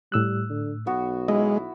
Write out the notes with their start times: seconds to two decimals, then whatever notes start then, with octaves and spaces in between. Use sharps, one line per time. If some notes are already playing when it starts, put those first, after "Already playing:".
0.12 A2 G3 E6 F#6
0.50 D3
0.87 B1 B3 F#4
1.28 G#3 E4 D#5